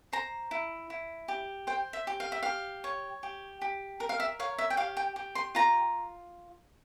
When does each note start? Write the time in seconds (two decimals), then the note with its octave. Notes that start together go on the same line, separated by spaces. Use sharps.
0.13 C5 A#5
0.51 E4
0.90 E4
1.28 G4
1.67 C5 G5
1.93 E5
2.07 G4
2.20 F5
2.32 E5
2.43 G4 F5
2.84 C#5
3.23 G4
3.62 G4
4.00 A#4
4.09 F5
4.20 E5
4.39 C#5 F5
4.58 E5
4.70 G5
4.77 G4 F5
4.97 G5
5.16 G4
5.35 C6
5.55 F4 A#5